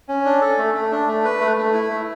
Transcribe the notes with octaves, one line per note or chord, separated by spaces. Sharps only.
C#4
D4
A4
A3
A3
D4
A3
B4
A3
A3
E4
A3